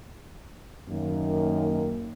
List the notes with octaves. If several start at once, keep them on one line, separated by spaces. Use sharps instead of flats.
F#2 D#3 A#3